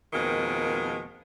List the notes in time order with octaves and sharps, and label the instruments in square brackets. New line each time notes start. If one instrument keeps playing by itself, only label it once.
[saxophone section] F2 B2 D#3 G#3 A#3